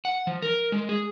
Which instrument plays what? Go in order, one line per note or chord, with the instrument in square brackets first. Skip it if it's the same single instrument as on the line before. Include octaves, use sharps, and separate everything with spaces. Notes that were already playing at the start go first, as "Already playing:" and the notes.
[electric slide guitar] F#5
F3
A#4
G#3
G#4